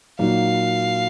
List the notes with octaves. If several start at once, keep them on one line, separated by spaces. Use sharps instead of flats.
A#2 F#3 A#3 D#4 F#4 F5